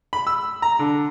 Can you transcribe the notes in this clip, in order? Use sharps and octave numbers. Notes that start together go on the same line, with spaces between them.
B5
E6
A#5
D3